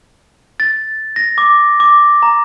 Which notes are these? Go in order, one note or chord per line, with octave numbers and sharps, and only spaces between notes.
A6
A#6
D6
D6
A#5